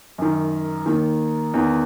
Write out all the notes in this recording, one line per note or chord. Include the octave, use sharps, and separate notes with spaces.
F#2 D#3
D#2 D#3
E2 D#3